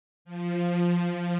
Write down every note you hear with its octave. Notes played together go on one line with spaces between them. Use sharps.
F3